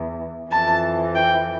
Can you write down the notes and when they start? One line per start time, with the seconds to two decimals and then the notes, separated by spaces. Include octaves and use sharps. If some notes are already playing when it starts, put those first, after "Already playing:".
Already playing: E2
0.51 F2 E3 A5
1.15 G5